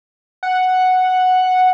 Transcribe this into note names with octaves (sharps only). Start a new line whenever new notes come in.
F#5